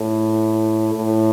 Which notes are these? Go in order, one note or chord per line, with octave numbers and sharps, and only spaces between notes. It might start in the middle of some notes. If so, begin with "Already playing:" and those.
Already playing: A2
A2